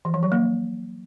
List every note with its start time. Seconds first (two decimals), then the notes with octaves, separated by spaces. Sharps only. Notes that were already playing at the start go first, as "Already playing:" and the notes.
0.05 E3
0.14 F3
0.23 F#3
0.32 A#3